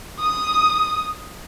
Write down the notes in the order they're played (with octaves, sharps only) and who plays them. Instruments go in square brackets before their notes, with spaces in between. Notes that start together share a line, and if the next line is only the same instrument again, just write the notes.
[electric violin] D#6